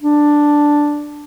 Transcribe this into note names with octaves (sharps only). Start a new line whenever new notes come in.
D4